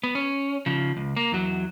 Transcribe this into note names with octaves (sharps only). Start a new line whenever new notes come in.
B3
C#4
C#3 F3
C#2
A#3
E2 F#3